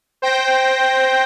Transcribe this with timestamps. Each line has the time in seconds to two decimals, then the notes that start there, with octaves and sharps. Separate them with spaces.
0.22 C5 G5 G6 A#6